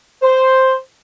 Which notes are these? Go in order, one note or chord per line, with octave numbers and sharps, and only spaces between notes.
C5